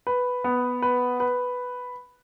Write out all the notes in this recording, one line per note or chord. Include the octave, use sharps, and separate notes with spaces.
B4
B3
B4
B4